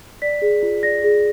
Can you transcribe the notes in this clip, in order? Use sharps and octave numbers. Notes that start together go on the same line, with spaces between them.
D5 B6
G#4
F4
D5 A#6
G#4